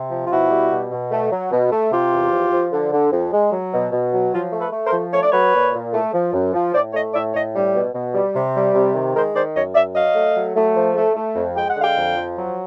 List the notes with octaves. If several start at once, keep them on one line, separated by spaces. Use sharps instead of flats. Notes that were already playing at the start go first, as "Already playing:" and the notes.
Already playing: C3
F3
F4
B2 E4 F#4
G3
B2
B2
A3
F#3
B2
A3
C3 F4 G4
E2
F3
F3
D3
D3
F2
G#3
F#3
B2
B2
F#3
F3 F4
A3
A4 B4
A3
A#4 C5
F3
A3 C#5
D5
F#3 B4 C#5
A#2
A#2
A3
F3
F#2
F3
A2 C5 D5
A3 C#5 D#5
A2 D5 E5
A2 C#5 D#5
G3
B2
B2
G3
C3
G3
C3
D#3
G#3 A#4 C5
D#3 C5 D5
F#2 C#5 D#5
F#2 D5 E5
F#3 D#5 F5
A3
F#3
A3
F3
A3
A3
F2
G#3 G5
F#5
D3
F5 G5
F2
F3
F#3